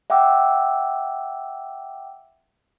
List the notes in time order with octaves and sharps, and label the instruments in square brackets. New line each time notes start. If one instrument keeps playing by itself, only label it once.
[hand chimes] E5 F#5 G5 D6 E6